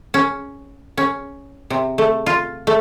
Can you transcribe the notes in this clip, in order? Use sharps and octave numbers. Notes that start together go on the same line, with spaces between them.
C#4
C#4
C3
A3
F4
A3